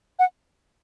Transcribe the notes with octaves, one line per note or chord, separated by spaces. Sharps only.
F#5